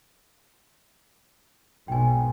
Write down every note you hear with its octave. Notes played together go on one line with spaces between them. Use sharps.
B1 G#2 G5 G#5